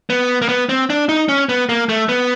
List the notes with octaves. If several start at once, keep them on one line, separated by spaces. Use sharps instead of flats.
B3
A#3
B3
C4
D4
D#4
C#4
B3
A#3
A3
B3